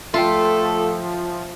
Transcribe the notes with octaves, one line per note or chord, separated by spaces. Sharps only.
F3 A3 F4 A4 E5 G5